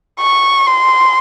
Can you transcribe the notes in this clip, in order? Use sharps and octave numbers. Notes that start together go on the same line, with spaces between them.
C#6
C6